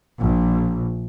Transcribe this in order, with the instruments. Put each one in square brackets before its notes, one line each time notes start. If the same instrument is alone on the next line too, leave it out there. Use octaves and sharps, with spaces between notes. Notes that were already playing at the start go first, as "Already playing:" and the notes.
[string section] A#1